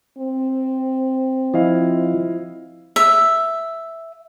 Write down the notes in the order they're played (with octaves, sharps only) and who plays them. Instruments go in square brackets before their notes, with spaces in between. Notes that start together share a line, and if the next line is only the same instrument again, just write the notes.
[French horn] C4
[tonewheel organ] F3 [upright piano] E4 D#5 F5
[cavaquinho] E5